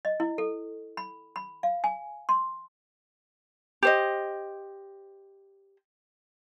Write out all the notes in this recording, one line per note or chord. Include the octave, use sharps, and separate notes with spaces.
D#5
E4
A4
B5
B5
F5
G#5
C6
G4 C5 D#5